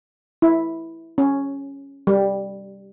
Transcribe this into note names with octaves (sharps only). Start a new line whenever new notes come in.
E4
C#4
G3